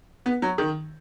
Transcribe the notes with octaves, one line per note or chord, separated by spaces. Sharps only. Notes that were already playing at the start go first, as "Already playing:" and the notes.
B3
F#3
D#3